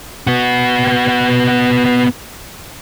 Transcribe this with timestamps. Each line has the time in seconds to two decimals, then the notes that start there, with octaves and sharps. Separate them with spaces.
0.27 B3 F#4